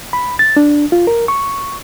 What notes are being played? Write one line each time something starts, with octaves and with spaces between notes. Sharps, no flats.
B5
A6
D4
F4
A#4
C#6